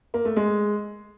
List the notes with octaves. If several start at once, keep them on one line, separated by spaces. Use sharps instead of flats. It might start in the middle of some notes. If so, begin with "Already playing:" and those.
A#3
A3
G#3